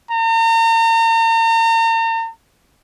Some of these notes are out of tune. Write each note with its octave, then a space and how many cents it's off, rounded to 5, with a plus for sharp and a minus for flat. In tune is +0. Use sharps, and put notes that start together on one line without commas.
A#5 -40